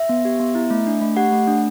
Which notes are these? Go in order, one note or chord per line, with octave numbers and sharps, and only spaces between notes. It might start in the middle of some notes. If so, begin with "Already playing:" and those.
Already playing: E5
B3
G4
B3
E4
A3
D4
A3
G4 F#5
A3
D4